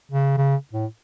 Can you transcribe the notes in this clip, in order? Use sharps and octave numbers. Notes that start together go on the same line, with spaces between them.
C#3
C#3
A2